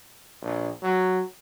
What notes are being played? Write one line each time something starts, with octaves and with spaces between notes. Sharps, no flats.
A#1
F#3